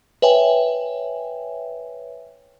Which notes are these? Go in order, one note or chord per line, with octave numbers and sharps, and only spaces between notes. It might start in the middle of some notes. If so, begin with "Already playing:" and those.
B4 C#5 E5 G5 G#5